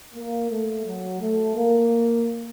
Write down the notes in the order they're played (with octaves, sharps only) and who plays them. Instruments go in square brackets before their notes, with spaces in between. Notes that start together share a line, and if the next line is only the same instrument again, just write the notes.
[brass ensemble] A#3
A3
F#3
A3
A#3